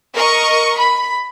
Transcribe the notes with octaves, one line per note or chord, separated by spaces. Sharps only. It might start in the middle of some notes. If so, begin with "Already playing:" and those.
A#4 D#5 C#6
B5